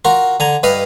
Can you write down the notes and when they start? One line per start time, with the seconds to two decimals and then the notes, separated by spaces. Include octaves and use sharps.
0.05 F4 F#4 A#4
0.40 D3 G#5 A#5
0.63 G2 B4 D#5 F5